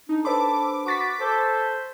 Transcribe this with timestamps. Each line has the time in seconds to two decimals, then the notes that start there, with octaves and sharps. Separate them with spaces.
0.09 D4 D#4
0.25 A4 B4 C5 B5 D6
0.86 F#4 C#6 A6 B6
1.21 A4 C5